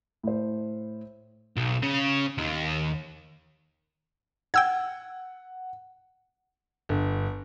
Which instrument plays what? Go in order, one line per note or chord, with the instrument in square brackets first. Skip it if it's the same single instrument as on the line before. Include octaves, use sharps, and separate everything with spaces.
[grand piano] A2 C5
[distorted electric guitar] B1
C#3
D#2
[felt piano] F#5 [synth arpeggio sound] G5 E6 G#6
[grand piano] G1